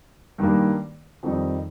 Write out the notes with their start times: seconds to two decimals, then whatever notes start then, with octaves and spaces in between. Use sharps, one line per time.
0.38 G2 D#3 G3 A#3
1.23 F2 D#3 G3 C4 D#4